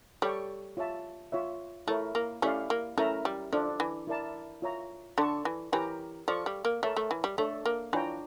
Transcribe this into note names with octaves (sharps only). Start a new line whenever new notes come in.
G3 A4 C#5 G5 C#6
F4 C#5 E5 A5
F4 C#5 E5
A3 E4 A#4 C#5
A#3
A3 C#4 E4 G4 D5 F5
A#3
A3 C#4 E4 A#4 E5 A#5
G3
F3 D4 A4 D5
E3
E4 A#4 D5 A5
F4 C#5 E5 A#5
D3 A4 D5 A5 C#6
E3
E3 G4 A#4 C#5 G5 A#5
F3 A4 D5 F5 C#6
G3
A#3
A3 A#4 C#5 E5 A5
A3
E3
G3
A3 D4 A4 C#5 E5
A#3
E3 D4 F4 C#5 G5 A#5